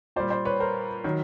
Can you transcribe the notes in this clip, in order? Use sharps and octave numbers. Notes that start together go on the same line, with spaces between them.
A#2 G3 C5 D5
C5 D5
B4 C#5
A#4 C5
D#3 F#3